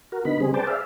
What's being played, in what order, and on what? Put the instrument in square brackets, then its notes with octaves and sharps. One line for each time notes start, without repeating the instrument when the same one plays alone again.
[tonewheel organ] F#4 A#4
D3 B3 D#4 B5
C#3 G3 C4 G#4
G#4 B4 C5 D5 G5 A5
G#4 D5 E5 F5